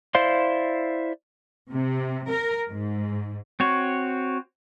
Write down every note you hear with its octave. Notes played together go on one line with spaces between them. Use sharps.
E4 C5 D5 F5 C6
C3
A#4
G#2
C4 F#4 C#5